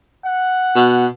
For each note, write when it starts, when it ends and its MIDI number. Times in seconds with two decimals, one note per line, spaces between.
0.25 1.09 78
0.76 1.07 47